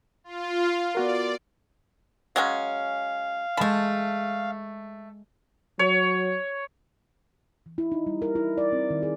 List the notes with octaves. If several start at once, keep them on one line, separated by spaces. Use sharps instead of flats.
F4
B3 F#4 A#4 D5
F#3 G#3 C#4 F5
G#3 A3 A5 B5
F#3 C#5
E3
E4
D#4
G3
A#4
E4
D5
C4
D#3
G#4